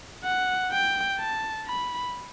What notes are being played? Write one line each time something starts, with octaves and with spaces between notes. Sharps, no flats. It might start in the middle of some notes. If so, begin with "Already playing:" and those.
F#5
G5
A5
B5